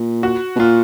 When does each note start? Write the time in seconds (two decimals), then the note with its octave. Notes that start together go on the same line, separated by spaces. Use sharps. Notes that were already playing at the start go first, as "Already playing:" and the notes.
Already playing: A#2
0.23 F#4
0.56 B2
0.59 A#2 F4